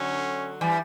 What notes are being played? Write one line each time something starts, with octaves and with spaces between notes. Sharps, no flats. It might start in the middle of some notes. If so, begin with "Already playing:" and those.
Already playing: D3 F#3 C#4
E3 G3